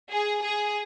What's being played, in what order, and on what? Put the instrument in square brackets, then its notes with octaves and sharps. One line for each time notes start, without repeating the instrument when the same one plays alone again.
[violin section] G#4
G#4